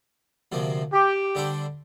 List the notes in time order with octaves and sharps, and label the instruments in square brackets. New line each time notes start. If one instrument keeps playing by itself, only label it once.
[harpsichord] D2 C3 F3 A#3
[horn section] G4
[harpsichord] D3 G3 D4 A4 C5